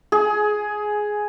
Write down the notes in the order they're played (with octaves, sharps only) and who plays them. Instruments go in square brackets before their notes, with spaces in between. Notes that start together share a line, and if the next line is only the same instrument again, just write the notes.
[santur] G#4